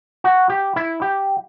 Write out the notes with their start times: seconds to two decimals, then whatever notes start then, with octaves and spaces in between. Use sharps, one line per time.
0.24 F#4
0.50 G4
0.76 E4
1.02 G4